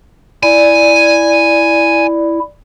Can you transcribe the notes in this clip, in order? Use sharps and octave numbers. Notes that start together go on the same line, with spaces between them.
E4 D5 G#5